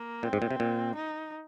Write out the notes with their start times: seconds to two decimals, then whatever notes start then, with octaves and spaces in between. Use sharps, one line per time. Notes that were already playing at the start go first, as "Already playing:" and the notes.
Already playing: A#3
0.23 A#2 C4
0.33 G#2
0.42 A#2
0.51 C3
0.60 A#2
0.96 D#4